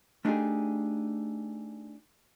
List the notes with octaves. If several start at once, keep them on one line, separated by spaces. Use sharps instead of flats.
A3 D4 D#4 F4 G4 G#4